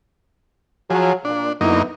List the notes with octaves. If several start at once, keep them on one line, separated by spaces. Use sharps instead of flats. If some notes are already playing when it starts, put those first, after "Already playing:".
F3 F#3 G#4
A#2 D4
F#2 D3 A#3 B3 D#4 E4